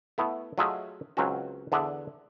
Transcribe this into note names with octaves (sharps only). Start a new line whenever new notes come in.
A3 B3 E4
F#3 A3 F4 G#4 D#5 E5
C#2 F#3 C4 C#4 F#4
E2 D3 G#4 D5 E5 F#5